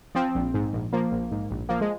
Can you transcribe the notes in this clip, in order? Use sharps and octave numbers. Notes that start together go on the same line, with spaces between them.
F3 C4
A#1
G#2
A#1
F3 A#3
A#1
G#2
A#1
F3 A#3
G#3